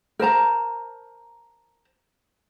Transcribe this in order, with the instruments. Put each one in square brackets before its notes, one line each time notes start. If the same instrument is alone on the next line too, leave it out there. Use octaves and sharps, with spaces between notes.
[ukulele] A#4 C5 A5 A#5